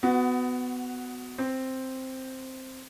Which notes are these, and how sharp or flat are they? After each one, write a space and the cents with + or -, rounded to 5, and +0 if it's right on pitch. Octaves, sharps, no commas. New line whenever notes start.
B3 +20 F#4 +0
C4 +0 C5 +0